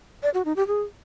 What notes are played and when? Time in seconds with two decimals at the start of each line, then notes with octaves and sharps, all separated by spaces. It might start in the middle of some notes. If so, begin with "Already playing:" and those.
0.23 D5
0.34 F#4
0.45 D#4
0.56 G4
0.67 G#4